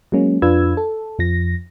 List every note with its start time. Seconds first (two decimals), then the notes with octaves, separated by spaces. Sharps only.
0.12 F#3 G#3 A#3 C#4
0.42 F2 D4 F4 B4 E6 G#6
0.77 A4
1.19 F2 F3 A#6